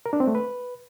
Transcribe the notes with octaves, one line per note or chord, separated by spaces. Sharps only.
A#4
D4
C4
A3
B4